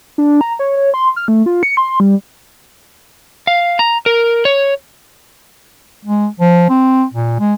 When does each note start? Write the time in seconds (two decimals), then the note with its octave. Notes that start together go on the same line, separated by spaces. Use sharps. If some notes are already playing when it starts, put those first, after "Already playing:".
0.18 D4
0.41 A#5
0.59 C#5
0.76 C#5
0.94 C6
1.16 F6
1.28 A3
1.46 F4
1.63 C#7
1.77 C6
2.00 G3
3.47 F5
3.79 A#5
4.06 A#4
4.45 C#5
6.05 G#3
6.40 F3
6.70 C4
7.14 A#2
7.40 G#3